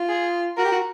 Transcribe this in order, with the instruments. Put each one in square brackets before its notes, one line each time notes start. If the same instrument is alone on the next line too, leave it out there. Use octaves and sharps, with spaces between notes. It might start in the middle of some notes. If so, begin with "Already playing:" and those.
Already playing: [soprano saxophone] F4
[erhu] G#4
[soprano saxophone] F#4 [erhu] A#4
[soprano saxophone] G4
F#4